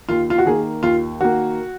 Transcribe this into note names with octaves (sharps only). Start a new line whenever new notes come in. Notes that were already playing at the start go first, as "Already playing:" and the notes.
D#2 F4
F4
F#4
D#3 A#3 G#4
D#2 F4
D#3 A#3 F#4